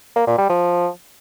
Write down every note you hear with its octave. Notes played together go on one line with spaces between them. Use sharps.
A#3
A#2
G3
F3